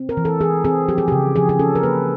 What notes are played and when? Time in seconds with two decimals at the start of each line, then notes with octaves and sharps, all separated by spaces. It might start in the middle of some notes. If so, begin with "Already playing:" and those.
Already playing: C4
0.09 A#4
0.17 E3
0.25 A4
0.40 E3 G#4
0.65 C4 G#4
0.88 F3 G4
0.98 G#4
1.08 G4
1.12 C#3
1.36 F3 G#4
1.49 G#4
1.59 C#4 A4
1.75 A#4
1.83 A#3 B4